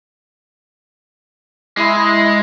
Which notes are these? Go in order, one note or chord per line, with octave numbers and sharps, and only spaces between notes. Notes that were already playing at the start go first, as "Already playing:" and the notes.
G#3 E4